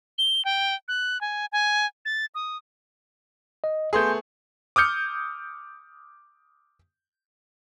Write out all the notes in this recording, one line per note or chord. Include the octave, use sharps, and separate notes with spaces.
G7
G5
F#6
G#5
G#5
A6
D#6
D#5
A3 B3 G#4 G#5 C6 G6
D6 D#6 F6 G6 C#7